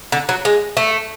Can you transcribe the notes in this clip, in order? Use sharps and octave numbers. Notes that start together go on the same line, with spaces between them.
D3
F#3
G#3
A3